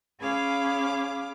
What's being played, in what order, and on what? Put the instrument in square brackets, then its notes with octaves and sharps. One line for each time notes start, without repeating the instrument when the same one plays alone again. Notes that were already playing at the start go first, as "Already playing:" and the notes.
[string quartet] C#4 G#4 F5 B5 D6